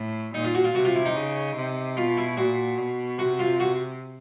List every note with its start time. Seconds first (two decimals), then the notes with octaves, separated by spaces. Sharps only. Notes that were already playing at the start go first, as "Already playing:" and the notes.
Already playing: A2
0.34 A#2 D#4
0.44 F4
0.55 F#4
0.64 F4
0.75 C3 F#4
0.85 F4
0.95 E4
1.05 D#4
1.15 C#3
1.56 C3
1.97 B2 F4
2.17 E4
2.37 A#2 F#4
2.78 B2
3.18 C3 F#4
3.39 F4
3.60 F#4